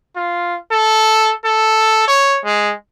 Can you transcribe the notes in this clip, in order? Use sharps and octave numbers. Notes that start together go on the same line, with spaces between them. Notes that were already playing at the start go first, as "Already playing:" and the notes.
F4
A4
A4
C#5
G#3